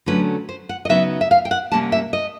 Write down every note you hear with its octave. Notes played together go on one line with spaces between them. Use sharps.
D3 F#3 A3 C#4 B4
C5
F#5
D#5
C#3 F#3 B3 D#4 E5
E5
F5
G5
F#5
C3 E3 G3 A#3 C#4 A5
E5
D#5